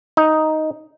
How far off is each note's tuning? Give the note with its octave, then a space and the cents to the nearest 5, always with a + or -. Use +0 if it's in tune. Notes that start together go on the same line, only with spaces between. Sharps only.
D#4 +5